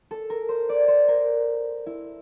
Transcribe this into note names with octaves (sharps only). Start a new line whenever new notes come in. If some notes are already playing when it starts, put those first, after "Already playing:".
A4
A#4
C5
D5
C5
A#4
E4